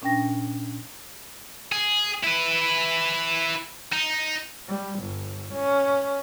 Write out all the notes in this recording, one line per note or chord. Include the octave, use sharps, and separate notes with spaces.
A#2 C#4 D4 G5 A#6
G#4
E4 B4
D#4
G3
G1
C#4